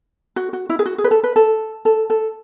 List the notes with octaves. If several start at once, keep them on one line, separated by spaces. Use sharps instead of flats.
F#4
F#4
E4
G#4
F#4
G#4
B4
A4
B4
A4
A4
A4